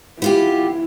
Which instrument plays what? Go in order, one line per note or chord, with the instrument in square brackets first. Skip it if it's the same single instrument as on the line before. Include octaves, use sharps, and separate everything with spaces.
[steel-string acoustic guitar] B3 F4 G4 [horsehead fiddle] E4